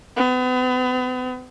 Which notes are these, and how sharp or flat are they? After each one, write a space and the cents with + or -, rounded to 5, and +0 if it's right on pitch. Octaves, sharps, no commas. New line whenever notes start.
B3 +40